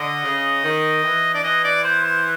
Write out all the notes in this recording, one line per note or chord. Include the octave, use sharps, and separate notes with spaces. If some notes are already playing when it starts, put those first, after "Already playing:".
Already playing: D3 D#5
C#3
D#3
E3
D5
E3 D#5
D5
C5
C5